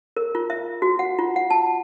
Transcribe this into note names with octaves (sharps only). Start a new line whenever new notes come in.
A#4
F4
E5
F#4
F#5
F4
F#5
A5